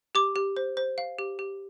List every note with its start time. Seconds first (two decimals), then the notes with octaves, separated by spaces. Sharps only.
0.15 G4 D6
0.36 G4
0.57 C5
0.77 C5
0.98 F5
1.19 G4
1.39 G4